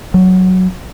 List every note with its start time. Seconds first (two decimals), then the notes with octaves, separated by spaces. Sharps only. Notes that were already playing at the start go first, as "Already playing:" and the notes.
0.14 F#3